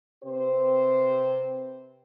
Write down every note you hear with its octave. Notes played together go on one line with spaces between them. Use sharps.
C3 C4 G4 B4 C5